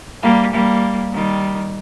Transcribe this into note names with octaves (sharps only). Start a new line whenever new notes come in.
G3 A#3
G3 A#3
D#3 G3